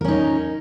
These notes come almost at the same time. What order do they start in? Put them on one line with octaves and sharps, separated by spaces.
A#4 C#4 D#4